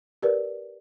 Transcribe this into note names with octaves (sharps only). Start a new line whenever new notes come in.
G4 A#4 B4 D5